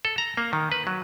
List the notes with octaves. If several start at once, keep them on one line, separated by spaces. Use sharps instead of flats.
A4
A#5
A#3
D#3
B4
F#3